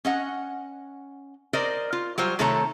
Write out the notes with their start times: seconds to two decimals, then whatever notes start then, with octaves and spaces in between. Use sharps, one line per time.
0.05 C#4 D#5 F#5
1.53 A#4 C5 D5 D#5
1.93 F4
2.18 F#3 G3 F4 C5
2.39 C3 D#3 A3 A4 C#5 A#5